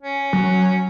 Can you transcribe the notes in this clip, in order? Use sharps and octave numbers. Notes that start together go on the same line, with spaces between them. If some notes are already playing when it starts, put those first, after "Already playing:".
C#4
F#3